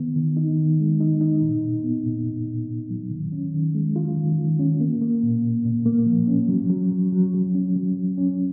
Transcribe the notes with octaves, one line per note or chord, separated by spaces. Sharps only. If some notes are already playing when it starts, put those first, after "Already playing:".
Already playing: D#3 B3
D#3
D#4
D#3
G#3
D#4
D#4
A#2
A#2
B3
A#2
A#2
A#2
A#2
F#3
D#3
C#4
D#3
G#3
F4
D#3
D#3
C#4
A#3
A#3
A#2
A#2
A#2
A#3
F3
C#4
F#3
F#3
F#3
F#3
F#3
C#4
F#3
F#3
C#4